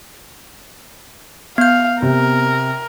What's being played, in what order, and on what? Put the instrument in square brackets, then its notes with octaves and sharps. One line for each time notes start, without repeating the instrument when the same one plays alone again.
[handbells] B3 G6 [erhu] F5
[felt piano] C3 [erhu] A#4